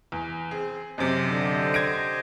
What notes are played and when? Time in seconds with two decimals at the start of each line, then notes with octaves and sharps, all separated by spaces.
0.12 E2
0.51 C4 G#4
0.98 F#2 C3 G4 C5 D#5
1.28 D3
1.74 G#6 A#6 D7